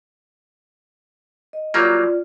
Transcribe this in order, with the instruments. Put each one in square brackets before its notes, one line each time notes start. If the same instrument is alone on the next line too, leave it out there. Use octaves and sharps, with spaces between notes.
[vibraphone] D#5
[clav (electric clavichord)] F#3 G3 A#3 [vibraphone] F4 D5